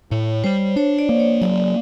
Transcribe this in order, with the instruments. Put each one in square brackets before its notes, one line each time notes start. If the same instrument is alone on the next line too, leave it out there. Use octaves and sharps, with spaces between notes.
[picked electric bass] A2 [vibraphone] C#5
[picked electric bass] G3 [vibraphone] C5
[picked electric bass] D4 [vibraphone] C#5
[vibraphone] D5
[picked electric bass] A#3
[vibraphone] C#5
[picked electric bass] F#3 [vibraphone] D5